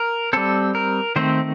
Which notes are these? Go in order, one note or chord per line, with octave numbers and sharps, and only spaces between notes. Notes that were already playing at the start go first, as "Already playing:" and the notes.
Already playing: A#4
G3 C4 A4
A#4
D#3 A3 C4 C5